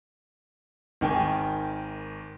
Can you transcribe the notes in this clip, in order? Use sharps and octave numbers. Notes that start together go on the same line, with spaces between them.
G#1 D#3 G5 G#5